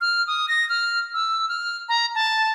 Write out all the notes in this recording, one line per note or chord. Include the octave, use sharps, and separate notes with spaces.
F6
D#6
A#6
F6
E6
F6
A#5
A5